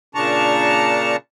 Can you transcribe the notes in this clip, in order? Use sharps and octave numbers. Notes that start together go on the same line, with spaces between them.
A#2 C#3 D4 A5 A#5 C#6